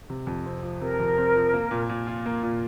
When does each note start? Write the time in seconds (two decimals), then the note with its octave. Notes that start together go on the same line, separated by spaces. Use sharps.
0.10 C3
0.27 F2
0.46 C4
0.63 F3
0.81 C3 A#4
1.00 F2
1.18 C4
1.35 F3
1.54 A#3
1.71 A#2
1.89 A#2
2.07 F4
2.26 A#3
2.43 A#2